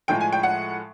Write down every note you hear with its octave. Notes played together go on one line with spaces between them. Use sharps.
A2 F3 G#3 G5
G#5
G5
F#5